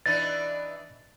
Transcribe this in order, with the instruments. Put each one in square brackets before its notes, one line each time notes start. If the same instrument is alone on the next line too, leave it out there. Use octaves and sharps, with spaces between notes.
[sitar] E3 D4 D#4 [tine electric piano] A6